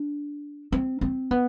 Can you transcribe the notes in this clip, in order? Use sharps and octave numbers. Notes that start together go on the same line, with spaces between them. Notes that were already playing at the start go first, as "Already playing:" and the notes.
Already playing: D4
C4
C4
B3